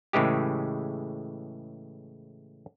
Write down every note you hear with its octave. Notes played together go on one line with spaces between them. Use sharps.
A2 C#3 E3 G#3 G4